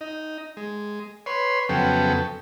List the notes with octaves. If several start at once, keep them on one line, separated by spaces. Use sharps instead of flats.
D#4
G#3
B4 C#5 C6
F2 C#3 F#3 B3 A4 G5